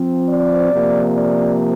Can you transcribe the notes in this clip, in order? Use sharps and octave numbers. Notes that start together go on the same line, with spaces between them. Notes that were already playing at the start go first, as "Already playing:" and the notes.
Already playing: F3 C4
D5
C3 F3 A#3
D5